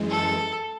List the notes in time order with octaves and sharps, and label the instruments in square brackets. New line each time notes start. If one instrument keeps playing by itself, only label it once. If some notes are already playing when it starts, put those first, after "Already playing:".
Already playing: [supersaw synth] F#2 E3 G#3
[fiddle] A4